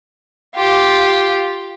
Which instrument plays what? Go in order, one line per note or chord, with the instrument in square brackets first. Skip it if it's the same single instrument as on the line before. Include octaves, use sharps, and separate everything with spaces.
[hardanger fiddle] F4 G4